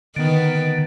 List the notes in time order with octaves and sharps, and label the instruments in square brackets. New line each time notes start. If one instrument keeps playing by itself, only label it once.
[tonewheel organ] D3 [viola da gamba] D#3 B3